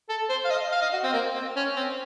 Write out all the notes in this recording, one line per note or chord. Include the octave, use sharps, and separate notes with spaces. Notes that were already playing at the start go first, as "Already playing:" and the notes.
A4
C5
F5
D#5
F5
D#5
F#4
C4
A#3
C4
C#4
C4